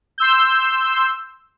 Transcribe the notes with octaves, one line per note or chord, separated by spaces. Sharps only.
C6 E6 G6